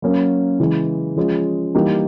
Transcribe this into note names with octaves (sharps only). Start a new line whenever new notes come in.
F#3 A#3 C#4
C#3 E3 G#3
F3 G#3 C#4 F4
E3 G3 A#3 D#4 G4